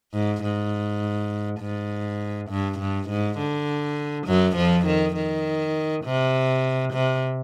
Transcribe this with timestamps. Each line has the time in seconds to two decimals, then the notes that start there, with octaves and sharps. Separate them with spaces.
0.13 G#2
0.43 G#2
1.61 G#2
2.50 G2
2.79 G2
3.09 G#2
3.38 D3
4.27 F#2 F#3
4.56 F2 F3
4.86 D#3
5.16 D#3
6.05 C3
6.93 C3